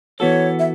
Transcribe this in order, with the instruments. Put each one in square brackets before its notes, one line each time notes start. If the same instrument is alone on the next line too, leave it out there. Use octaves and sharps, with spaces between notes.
[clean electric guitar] E3 B3 F#4 A4 [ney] C#5
[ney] E5